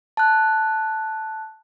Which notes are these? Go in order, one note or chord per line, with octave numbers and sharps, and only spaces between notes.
A5 F#6